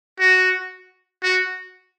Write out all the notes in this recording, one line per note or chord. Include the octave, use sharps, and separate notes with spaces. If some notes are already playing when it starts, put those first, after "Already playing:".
F#4
F#4